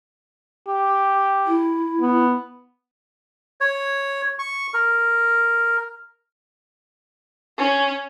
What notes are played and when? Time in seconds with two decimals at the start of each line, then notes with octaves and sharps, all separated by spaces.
0.68 G4
1.47 E4
2.01 B3
3.61 C#5
4.39 C#6
4.74 A#4
7.58 C#4